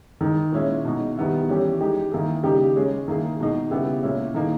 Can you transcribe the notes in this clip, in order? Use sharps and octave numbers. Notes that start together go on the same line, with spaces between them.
D#3 G#3 D#4
A#2 G#3 C#4 E4
B2 G#3 D#4 G#4
D#3 G3 B3 E4
E3 G3 C#4 G4
G#3 D#4 G4
D#3 A#3 E4 G#4
C#3 G3 A#3 D#4 G4
G#3 C#4 G#4
D#3 A#3 E4 G#4
B2 G#3 D#4 G#4
C#3 G3 B3 E4 G4
A#2 G#3 C#4 E4
D#3 A#3 D#4 G#4